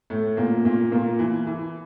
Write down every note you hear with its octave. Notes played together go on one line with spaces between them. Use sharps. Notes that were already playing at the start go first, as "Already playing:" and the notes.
A2 A3
A#2 A#3
A#2 A#3
A#2 A#3
E3
E3